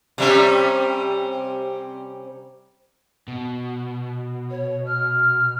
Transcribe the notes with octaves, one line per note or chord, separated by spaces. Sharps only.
C3 G3 C#4
B2
C#5
F6